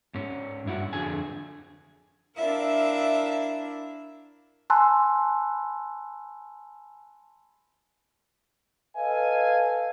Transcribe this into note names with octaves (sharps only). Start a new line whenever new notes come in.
G#2 C#4
G2 E4 F#4
F2 D3 G#4 G#5
D4 E4 A#4 E5 F5
G#5 A5 B5 C6 E6 F#6
A4 B4 D#5 F5 G#5